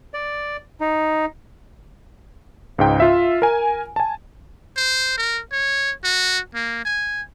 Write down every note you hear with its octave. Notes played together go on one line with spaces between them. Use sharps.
D5
D#4
C#2 G#2 G5
F4 E5
A#4 G#5
G#5 A5
C5
A#4
C#5
F#4
A#3
G#5